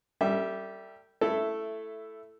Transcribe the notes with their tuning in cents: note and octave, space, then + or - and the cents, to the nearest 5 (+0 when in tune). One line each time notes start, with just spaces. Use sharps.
G3 -10 A4 +40 E5 -5
A3 +0 E4 +10 A4 +0